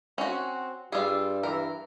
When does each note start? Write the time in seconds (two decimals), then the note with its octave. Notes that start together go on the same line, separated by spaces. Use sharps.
0.18 C4 C#4 F#4 F#5
0.92 G2 G3 F4 G#4 E6
1.43 E3 A#4